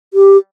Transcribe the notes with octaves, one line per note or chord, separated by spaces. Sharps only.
G4